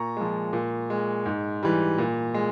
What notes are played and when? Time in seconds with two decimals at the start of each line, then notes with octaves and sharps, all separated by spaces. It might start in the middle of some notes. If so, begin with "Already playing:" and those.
Already playing: A#2 A#5 C#6
0.17 F3 G#3
0.53 A#2
0.90 G#3
1.26 G#2
1.63 E3 G3
1.98 A#2
2.34 G#3